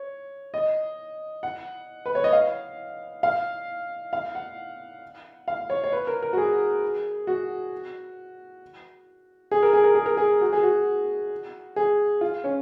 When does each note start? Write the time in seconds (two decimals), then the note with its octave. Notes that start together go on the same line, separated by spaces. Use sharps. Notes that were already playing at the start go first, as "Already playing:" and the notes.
Already playing: C#5
0.54 D#5
1.43 F#5
2.06 B4
2.15 C#5
2.24 D#5
2.33 F5
3.23 F5
4.13 F5
4.35 F#5
5.48 F5
5.70 C#5
5.84 C#5
5.93 B4
6.07 A#4
6.23 A#4
6.33 F#4
6.38 G#4
7.27 F#4
9.51 G#4
9.63 A#4
9.73 G#4
9.84 A#4
9.95 G#4
10.06 A#4
10.17 G#4
10.41 F#4
10.53 G#4
10.63 F#4
11.76 G#4
12.21 F4
12.44 C#4